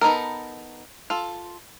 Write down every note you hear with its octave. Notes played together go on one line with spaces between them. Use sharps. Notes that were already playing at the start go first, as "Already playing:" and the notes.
B3 D#4 A4 A#4
F4 A4